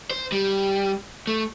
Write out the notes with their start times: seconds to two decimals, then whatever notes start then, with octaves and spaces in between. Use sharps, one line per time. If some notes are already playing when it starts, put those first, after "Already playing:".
0.11 C5
0.32 G3
1.27 A3